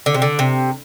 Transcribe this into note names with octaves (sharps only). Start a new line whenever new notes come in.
D3
C3
D3
C3